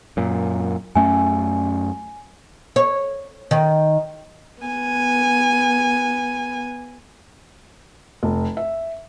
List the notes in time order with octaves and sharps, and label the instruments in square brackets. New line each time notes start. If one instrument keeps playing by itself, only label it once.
[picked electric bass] F#2 A#2
[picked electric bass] F#2 A3 C#4 [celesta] G#5
[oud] C#5
D#3
[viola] B3 G#5
[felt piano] F1
E5